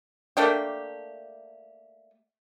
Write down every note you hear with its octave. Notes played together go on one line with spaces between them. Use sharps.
A3 A#3 D4 G4